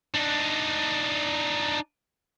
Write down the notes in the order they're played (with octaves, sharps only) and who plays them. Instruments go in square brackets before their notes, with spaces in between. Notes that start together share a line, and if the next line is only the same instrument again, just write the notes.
[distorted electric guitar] D4 D#4